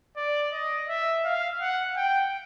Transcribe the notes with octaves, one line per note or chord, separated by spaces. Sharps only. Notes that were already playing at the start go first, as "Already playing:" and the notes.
D5
D#5
E5
F5
F#5
G5